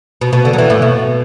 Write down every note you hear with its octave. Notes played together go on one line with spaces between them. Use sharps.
B2
B2
D3
F#3
E3
A2
B2